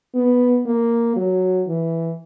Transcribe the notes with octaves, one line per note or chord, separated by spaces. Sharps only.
B3
A#3
F#3
E3